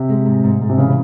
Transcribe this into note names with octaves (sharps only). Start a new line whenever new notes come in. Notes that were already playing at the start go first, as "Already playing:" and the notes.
Already playing: C3
G#3
G#2
G#2
G#2
C3
C#3 E3